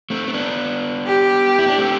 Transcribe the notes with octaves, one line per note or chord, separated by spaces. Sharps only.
A3 C4
C4
B3 D4
G4
E4
D4
A3 C4